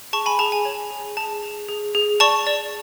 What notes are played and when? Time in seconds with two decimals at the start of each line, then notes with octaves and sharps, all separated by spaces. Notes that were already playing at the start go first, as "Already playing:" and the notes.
0.13 G#4 A5 C#6
0.26 G#5 B5
0.39 G#4 A5
0.52 G#5
0.65 C#5
0.91 G#4
1.17 G#4 A5
1.43 G#4
1.69 G#4
1.95 G#4
2.20 D5 A5 C#6
2.47 D5